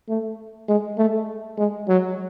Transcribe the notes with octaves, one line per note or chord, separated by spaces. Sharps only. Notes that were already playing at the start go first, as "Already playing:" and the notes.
A3
G#3
A3
G#3
F#3